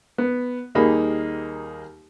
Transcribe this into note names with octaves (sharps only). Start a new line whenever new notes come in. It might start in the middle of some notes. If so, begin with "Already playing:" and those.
B3
D#2 G3 A#3 D#4 G#4 B5